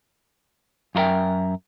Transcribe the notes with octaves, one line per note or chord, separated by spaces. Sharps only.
F#2 F4 A#4 E5 G5